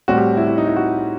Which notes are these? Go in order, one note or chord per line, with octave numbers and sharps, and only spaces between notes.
A2 G3 C4 F#4
G4
E4
E4
D#4
E4
F#4